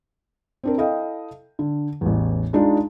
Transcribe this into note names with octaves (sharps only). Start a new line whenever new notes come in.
C4 D4 A#4
E4 A4 D#5 F5 G5
D3
A1 E2
G#3 D4 D#4 F4